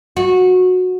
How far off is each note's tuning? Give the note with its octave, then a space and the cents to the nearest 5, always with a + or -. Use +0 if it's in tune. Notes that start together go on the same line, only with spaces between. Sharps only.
F#4 -15